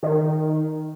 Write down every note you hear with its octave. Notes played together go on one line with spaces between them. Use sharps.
D#3